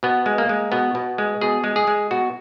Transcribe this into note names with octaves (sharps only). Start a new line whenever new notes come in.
B2 B3
G#3
A#3
G#3
B2 B3
B2
G#3
B2 G#4
G#3
G#4
G#3
B2 F#4